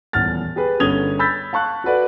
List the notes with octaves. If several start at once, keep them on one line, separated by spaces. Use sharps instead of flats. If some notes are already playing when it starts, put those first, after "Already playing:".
D#1 E2 F#5 F6 A6
G4 G#4 B4
G1 C#4 D#6 G#6 F7 G7
B5 E6 G6 A6 B6
F5 A5 C#6 F#6
F#4 A4 B4 D5 F#5